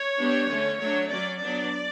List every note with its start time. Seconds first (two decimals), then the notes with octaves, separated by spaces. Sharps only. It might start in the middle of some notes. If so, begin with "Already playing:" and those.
Already playing: C#5
0.19 G3 B3 D4
0.50 D3 A3 C#4
0.80 F#3 A3 D4 C#5
1.10 F#3 C#4 D5
1.40 F#3 B3 D4 D5